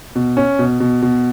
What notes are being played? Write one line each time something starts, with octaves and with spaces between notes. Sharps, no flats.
B2
C#4
B2
B2
B2